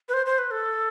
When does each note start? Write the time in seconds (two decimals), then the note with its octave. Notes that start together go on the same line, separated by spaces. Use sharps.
0.09 B4
0.14 C5
0.26 C5
0.38 B4
0.51 A4